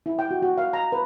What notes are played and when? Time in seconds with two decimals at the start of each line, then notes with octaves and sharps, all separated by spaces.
0.06 E4
0.19 G5
0.31 F#4
0.42 F#4
0.58 F5
0.73 A#5
0.92 B4